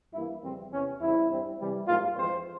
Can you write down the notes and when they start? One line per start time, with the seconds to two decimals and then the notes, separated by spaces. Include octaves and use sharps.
0.14 G2 E3 A#3 E4
0.43 F2 C#3 E3 G3 C4
0.72 E2 C3 E3 C#4
1.01 E2 C#3 G3 C4 E4
1.29 G2 G3 C4
1.59 C3 E3 G3
1.88 G#2 G3 A#3 F4
2.16 F2 E3 G#3 C4 C5